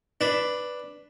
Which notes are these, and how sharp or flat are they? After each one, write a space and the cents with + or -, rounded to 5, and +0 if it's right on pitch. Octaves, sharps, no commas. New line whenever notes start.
D4 +0 B4 +0